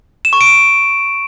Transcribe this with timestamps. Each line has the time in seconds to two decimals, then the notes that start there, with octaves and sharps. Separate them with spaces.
0.25 E7
0.33 C#6
0.41 D7